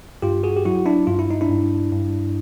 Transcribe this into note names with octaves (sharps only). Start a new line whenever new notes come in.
G2 F4 G4
F#4 G#4
G4
F#3 E4 F#4
D4 E4
G2 F4
E4
D#4
D4 E4
G2
G2